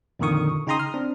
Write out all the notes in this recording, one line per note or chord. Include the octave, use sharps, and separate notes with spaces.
F2 A#2 D3 D#3 C#6 D#6
C#3 D#4 G5 A#5 C6 D#6
F6
C4 D4